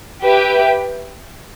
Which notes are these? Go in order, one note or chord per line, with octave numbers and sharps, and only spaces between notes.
G4 B4 E5 G5